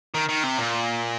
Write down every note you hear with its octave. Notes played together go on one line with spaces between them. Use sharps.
D#3
D#3
C3
A#2